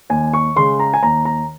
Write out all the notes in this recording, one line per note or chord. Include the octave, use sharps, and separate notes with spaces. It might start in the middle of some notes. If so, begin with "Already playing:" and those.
D#2 G#5
C#6
C#3 G#3 C6
A#5
G#5
D#2 A#5
A#5